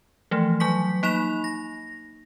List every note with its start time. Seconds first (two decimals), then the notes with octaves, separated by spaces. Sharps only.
0.31 E3 F3 A3
0.60 F#3 G#5 C#6 B6
1.03 A#3 D#4 B5 F7
1.44 A#6